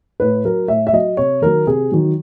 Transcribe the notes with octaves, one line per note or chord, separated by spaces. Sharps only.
A2 B4
F#3 A#4
A2 E5
E5
F#3 D#5
C3 C#5
D#3 F#3 A#4
C3 G#4
D#3 F#3